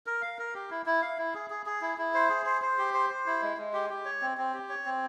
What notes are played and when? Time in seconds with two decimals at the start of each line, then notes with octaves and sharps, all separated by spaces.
0.06 A#4
0.22 F5
0.39 A#4
0.54 G4
0.70 E4
0.86 E4
1.02 F5
1.18 E4
1.35 G#4
1.50 G#4
1.66 G#4
1.81 E4
1.98 E4
2.14 C5
2.30 G#4
2.46 C5
2.62 C5
2.78 G4
2.94 C5
3.10 C5
3.26 E4
3.42 G#3
3.58 G#3
3.74 G4
3.90 G4
4.05 C#5
4.22 C4
4.38 C4
4.54 G4
4.69 C#5
4.85 C4